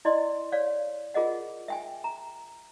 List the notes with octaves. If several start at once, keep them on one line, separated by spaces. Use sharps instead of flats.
E4 D5 D#5 C6
C#5 D5 F5
F4 G#4 A#4 D#5 F#5
E5 G5 G#5
A#5